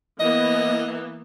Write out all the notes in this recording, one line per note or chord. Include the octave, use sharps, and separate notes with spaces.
E3 A#3 B3 D#5